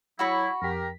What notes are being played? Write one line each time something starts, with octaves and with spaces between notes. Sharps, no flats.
F#3 E4 F#4 B5 C#6
F2 G4 A#4 B6